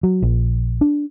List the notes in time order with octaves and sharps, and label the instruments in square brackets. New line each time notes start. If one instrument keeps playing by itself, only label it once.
[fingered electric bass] F#3
A#1
D4